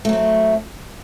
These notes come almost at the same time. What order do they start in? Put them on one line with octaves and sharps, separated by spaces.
A3 F#3 C4